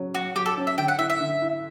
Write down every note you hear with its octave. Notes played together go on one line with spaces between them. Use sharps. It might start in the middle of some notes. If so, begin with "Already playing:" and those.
Already playing: C#3 F#3 C#4
F#3 F#4
F#3 G4
A4
C#4
E5
D3 G5
F#5
E4 E5
E5
D3
E4